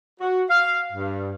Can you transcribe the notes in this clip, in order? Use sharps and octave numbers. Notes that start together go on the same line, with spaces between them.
F#4
F5
G2